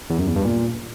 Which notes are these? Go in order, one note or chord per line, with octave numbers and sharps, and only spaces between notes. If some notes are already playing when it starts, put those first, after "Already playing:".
E2
F#2
E2
G2
A#2